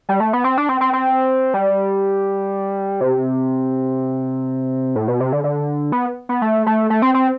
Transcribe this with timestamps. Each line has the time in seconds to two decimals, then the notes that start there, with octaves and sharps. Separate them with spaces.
0.09 G3
0.20 A3
0.33 B3
0.44 C4
0.58 D4
0.69 C4
0.81 C4
0.93 C4
1.54 G3
3.01 C3
4.96 A2
5.08 B2
5.20 C3
5.32 D3
5.44 D3
5.92 B3
6.29 B3
6.42 A3
6.66 A3
6.90 A3
7.02 C4
7.14 C4